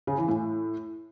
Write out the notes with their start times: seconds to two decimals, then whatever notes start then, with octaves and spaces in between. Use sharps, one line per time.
0.07 C#3
0.18 E3
0.28 A2